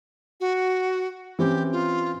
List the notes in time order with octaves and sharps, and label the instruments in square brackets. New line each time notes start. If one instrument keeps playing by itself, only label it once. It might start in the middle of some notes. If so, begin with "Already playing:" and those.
[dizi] F#4
[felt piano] E3 C4 C#4 [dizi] G4
[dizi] F4